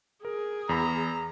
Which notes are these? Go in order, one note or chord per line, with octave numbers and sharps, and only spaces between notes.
G#4 A#4
E2 A#5 B5